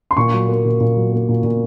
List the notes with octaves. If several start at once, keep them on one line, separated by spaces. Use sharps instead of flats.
C6
A#2 C#6
F#3
A#3
A#2
A#2
F#3
A#3
A#2
A#2